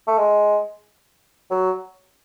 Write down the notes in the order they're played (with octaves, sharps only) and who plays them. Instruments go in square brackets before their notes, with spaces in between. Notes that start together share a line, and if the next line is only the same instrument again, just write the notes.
[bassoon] A3
G#3
F#3